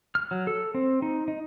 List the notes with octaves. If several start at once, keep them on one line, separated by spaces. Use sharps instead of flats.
F6
F#3
A4
C4
D#4
D#4